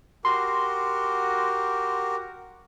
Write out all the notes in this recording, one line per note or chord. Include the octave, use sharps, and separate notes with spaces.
F#4 G4 A#4 C6